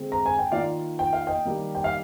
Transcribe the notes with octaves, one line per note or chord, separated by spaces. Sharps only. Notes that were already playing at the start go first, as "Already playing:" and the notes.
Already playing: D3 G#3 C4
A#5
G#5
G5
D#3 A#3 F4 D5 F5
G5
F5
D#5 G5
D#3 G3 A#3
G5
F5